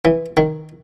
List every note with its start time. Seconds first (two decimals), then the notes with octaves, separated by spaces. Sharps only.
0.05 E3
0.37 D#3